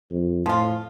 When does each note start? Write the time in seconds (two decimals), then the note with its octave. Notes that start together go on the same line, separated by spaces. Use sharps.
0.10 F2
0.46 A2 F3 F4